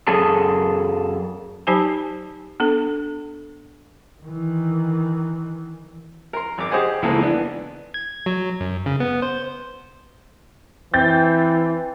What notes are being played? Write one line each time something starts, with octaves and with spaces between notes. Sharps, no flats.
F#2 G#4 A4 A5
F#3 D#4 G4 C5 G#5 A5
B3 D4 A4
D#3 E3
A#4 C6
G#1 D6
G4 G#4 C5 D#5 F#5 G#5
C#2 E3 G#3 A#3 C4 A4
E3 B3 D4
G#6
F#3
F#2
C#3
B3
C5
E3 C4 G6 A6